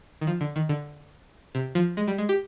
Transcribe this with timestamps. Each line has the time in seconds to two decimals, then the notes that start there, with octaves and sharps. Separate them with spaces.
0.21 D#3
0.27 F3
0.41 D3
0.56 D#3
0.69 D3
1.55 C3
1.75 F3
1.97 G#3
2.07 G3
2.18 G#3
2.29 G4